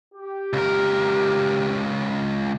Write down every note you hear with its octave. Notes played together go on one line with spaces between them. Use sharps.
G4
C#2 A#4